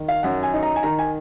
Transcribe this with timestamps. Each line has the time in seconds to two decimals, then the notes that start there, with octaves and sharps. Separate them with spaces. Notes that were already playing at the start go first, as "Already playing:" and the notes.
Already playing: D#3
0.08 F5
0.23 F#2 F#5
0.43 G#5
0.53 D#4
0.63 A#5
0.76 G#5
0.83 D#3 A#5
0.99 G#5